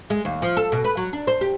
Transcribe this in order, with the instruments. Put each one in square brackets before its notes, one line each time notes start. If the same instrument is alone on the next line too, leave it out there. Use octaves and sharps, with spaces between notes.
[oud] G#3
D#2
F3
A4
B2
B4
F#3
D4
C5
G4